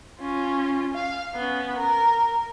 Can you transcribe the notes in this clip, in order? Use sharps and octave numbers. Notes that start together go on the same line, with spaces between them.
C#4 F4
F5
B3 C#4
A#4